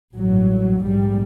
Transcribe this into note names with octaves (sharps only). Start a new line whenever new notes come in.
A1 G2 F#3
A#1 G#2 G3